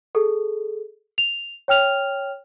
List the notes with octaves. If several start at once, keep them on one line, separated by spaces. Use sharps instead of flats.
G#4 A4
F7
C#5 G5 F6 F7